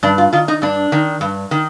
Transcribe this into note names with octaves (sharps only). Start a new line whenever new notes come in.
G2 D4
F4
D#3 F4
D#4
G2 D4
D#3
G2
D#3